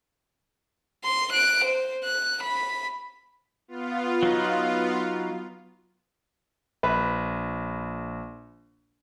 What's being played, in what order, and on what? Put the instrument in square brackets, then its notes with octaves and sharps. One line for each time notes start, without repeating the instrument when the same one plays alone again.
[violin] C6
F#6 D7
C5
F#6
B5
[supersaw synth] B3 F4
[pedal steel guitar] F#3 D#4
[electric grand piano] A#1 [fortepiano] B4